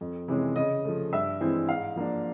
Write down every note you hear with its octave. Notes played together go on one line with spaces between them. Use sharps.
F2
C3 E3 G#3 C#4
C#3 D#5
F3 A3
G2 E5
E3 G#3 C4 E4
G#2 F5
F3 A#3 D4